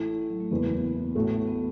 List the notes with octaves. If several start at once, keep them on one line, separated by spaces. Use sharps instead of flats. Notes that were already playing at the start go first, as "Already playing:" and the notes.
Already playing: A1 A2 A3 E4
F#3
A3
F#1 E2 E3 B3
B3
A1 A2 A3 F#4
B3